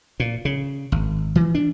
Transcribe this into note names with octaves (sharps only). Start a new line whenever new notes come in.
A#2
C#3
G#1
E3
D4